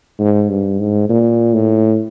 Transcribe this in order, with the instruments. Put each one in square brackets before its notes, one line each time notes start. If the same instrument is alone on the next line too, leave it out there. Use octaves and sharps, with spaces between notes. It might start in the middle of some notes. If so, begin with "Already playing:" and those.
[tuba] G#2
G2
G#2
A#2
A2